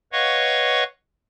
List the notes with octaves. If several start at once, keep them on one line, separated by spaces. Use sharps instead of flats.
B4 C#5 D#5 F5 F#5 C#6